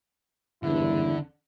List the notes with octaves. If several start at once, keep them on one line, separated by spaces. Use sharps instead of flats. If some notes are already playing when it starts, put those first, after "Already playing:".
F#1 E2 G2 D3 E4